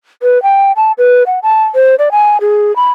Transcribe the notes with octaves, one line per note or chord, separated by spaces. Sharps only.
B4
G5
A5
B4
F#5
A5
C5
D5
G#5
G#4
B5